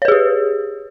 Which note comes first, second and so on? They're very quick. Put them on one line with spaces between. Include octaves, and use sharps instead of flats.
C#5 B4 G#4 G4